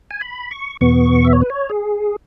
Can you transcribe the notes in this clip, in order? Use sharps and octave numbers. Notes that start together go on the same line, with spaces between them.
G#5
B5
C#6
E2 B2 B3 C#6
E5
C#5
B4
C#5
G#4